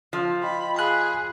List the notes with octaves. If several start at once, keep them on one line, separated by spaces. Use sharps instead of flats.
F3
F4 D#5 G5 B5
G#4 F5 B5 F6 F#6 C7